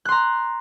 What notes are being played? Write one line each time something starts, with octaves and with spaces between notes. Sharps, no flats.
A#5 C6 F#6